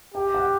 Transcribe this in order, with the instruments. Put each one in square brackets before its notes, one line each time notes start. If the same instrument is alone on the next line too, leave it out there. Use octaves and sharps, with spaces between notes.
[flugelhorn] G4 [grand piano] G5
[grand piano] F#5